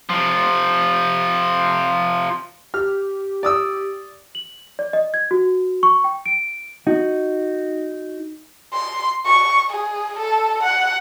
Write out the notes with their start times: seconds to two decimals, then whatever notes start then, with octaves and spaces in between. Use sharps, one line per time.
0.10 C3 F3
2.74 G4 F6
3.43 D5 D#6 E6
4.35 F#7
4.79 D5
4.93 D#5
5.14 G#6
5.31 F#4
5.83 C#6
6.04 G5
6.26 D7
6.87 D#4 F#4
8.73 C6
9.26 C#6
9.70 G#4
10.19 A4
10.63 F#5